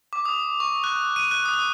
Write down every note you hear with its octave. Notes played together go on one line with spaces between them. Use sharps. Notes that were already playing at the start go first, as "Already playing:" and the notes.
D6
D#6
C#6
F#6
D#7
F#6
D#6